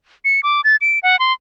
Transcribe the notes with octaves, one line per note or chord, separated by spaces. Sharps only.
C#7
D6
A6
D7
F#5
C6